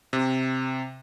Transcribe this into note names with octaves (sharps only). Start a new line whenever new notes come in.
C3